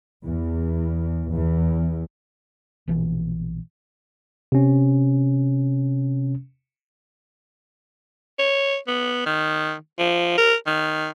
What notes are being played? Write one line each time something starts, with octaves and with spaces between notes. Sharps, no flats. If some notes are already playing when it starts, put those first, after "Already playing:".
E2
E2
A#1 B2 E3
C3 C#4
C#5
B3
D#3
F3
A#4
D#3